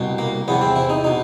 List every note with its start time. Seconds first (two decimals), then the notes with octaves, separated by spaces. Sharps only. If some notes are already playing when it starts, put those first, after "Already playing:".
Already playing: C2 B2
0.18 A#3
0.48 E2 C3 E3 B3
0.61 C4
0.76 E4
0.90 D#4
1.04 B2 D#4